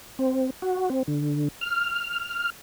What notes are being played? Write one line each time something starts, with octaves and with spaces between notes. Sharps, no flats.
C4
F#4
C4
D3
F6
F6